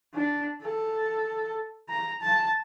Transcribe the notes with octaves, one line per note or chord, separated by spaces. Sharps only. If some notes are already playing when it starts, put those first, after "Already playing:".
D4
A4
A#5
A5